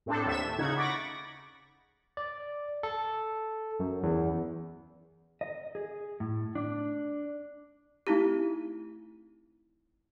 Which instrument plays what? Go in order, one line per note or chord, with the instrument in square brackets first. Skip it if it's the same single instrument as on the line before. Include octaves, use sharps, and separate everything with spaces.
[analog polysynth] A2 C4 D4 A4
D#2 E5 E7
A3
C#3 D#4 F#5 G#6
B5 C#6 D6 A6 A#6
[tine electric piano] D5
A4
F#2
E2
[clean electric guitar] D#5
G#4
A2
D4
[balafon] A3 C4 D#4 E4 G4